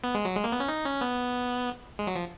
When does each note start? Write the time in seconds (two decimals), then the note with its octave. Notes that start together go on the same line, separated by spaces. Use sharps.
0.04 B3
0.15 G#3
0.25 F#3
0.36 G#3
0.44 A#3
0.52 B3
0.60 C#4
0.68 D#4
0.85 C#4
1.01 B3
1.99 G#3
2.07 F#3
2.16 F3